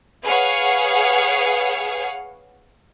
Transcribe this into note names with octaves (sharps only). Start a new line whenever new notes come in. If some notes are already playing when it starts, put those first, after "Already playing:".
G#4 B4 C#5 F5 F#5